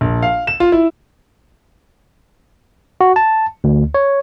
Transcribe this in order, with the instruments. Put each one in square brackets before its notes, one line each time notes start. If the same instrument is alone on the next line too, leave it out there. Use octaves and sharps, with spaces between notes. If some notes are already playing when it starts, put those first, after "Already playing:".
[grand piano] A#1
F5
E7
F4
E4
[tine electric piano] F#4
A5
D2
C#5